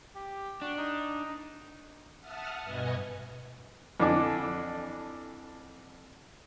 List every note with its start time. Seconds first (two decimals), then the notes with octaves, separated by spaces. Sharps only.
0.15 G4
0.62 D4 F#4
0.77 D#4
2.20 E5 F#5 A5 D#6 F6
2.63 G2 B2 B4 D#5 G#5 C#6
4.00 F2 D3 E3 D4 G#5 D6